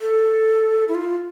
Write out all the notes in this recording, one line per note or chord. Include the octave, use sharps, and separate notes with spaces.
A4
E4
F4